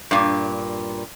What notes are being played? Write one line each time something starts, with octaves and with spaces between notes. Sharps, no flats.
G2 A#2